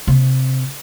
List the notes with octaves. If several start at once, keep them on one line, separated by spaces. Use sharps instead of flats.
C3